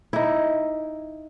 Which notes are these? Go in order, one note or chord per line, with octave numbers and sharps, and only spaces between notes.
D#4 E4